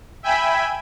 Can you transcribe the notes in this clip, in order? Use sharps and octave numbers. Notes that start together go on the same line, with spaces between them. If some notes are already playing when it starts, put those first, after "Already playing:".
E5 G5 G#5 B5